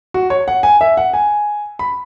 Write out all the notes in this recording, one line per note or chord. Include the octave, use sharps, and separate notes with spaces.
F#4
C#5
F#5
G#5
E5
F#5
G#5
B5